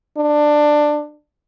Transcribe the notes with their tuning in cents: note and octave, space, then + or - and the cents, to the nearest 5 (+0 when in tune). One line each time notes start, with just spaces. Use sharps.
D4 +15